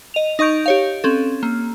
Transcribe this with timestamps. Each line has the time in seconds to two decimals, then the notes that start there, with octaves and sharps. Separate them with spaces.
0.14 D#5 F7
0.39 D#4 D#5 C#6 G6 D7
0.66 G4 C#5 F5
1.04 C4 C#4 A4
1.43 A#3